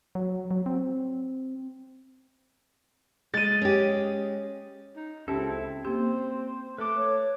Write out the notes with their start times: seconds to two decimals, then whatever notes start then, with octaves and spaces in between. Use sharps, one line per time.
0.15 F#3
0.51 F#3
0.66 C4
3.34 G#3 A6 D#7
3.62 C#4 G4
4.96 D#4
5.28 C#2 C4 C#4 E4 G4 A4
5.85 A#3 C4 G4 C5
6.78 A3 B4 D6
6.97 C#5